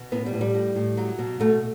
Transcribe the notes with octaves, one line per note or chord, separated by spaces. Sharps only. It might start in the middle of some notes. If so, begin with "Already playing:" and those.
Already playing: B2
A2 B3
G3
A2
G3
A2
A2
F#3
B2
B2 A3